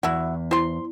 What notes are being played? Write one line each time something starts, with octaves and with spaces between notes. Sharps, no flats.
E2 E4 F#4
E4 C5 C6